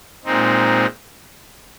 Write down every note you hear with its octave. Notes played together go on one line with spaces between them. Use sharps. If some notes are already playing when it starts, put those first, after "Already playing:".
A#2 G#3 C4 D#4